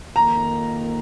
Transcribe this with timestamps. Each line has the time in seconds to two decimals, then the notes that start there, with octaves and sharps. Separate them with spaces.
0.16 F2 D#3 A#3 A#5